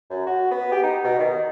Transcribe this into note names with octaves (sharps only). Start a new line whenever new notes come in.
F#2
F#4
B3
G4
D#4
B2
D#3